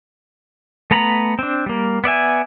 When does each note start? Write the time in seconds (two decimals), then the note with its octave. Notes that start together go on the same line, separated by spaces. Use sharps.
0.91 A3 B3 A#5 B5
1.39 C4 D4
1.66 G3 A#3
2.04 B3 D5 E5 G#5